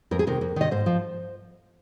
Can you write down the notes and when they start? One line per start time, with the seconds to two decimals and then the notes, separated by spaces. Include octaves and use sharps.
0.11 F2 A#4
0.19 G#4
0.27 C3 D#3 A#4
0.41 F2
0.56 C3 D#3 D#5
0.71 G#2 C5
0.86 F3